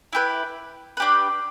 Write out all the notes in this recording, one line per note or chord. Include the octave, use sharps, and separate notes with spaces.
E4 G4 B4
D4 G4 B4